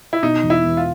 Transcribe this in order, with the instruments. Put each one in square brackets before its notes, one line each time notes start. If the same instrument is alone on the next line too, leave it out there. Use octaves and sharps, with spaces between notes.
[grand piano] E4
[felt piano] B2 [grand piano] D#4
[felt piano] E1
[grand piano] E4
[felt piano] E2
[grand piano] F4